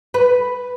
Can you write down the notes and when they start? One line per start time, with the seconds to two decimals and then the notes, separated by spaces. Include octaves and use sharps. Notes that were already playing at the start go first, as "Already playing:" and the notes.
0.14 B4